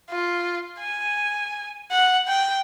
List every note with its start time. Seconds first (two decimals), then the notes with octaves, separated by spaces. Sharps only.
0.10 F4
0.80 G#5
1.91 F#5
2.28 G5